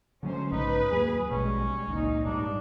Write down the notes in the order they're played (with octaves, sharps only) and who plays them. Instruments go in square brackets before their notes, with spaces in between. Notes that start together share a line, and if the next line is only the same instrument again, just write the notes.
[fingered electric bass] D3 F#3 A3 [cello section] C#4 C5
[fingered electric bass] A#1 G#2 C#3 [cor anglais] D#4 [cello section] B4
[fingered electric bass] D#2 F#3 A#3 [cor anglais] G#4
[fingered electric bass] A#1 B2 [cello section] G3 G#3 [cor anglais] C#4
[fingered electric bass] G#1 C#2 [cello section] A#2 D#4
[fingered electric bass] G#2 G3 [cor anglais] D4